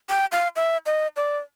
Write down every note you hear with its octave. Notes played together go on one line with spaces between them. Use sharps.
G5
F5
E5
D#5
D5